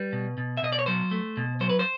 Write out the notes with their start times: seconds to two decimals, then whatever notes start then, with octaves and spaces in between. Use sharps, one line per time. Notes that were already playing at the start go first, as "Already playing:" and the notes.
Already playing: G3 B4
0.13 B2
0.38 B2
0.57 E5
0.63 B2 D#5
0.72 D5
0.79 C#5
0.86 F#3 C5
1.11 A3
1.37 B2
1.61 F#3 C5
1.70 B4
1.79 C5